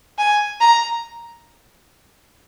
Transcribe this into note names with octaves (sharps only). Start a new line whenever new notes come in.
G#5
A#5